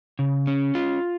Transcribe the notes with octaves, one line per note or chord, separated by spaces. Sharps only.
C#3
C#4
F4